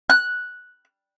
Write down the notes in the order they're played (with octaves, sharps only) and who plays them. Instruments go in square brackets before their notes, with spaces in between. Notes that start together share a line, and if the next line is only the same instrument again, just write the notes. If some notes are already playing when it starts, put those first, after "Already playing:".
[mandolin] F#6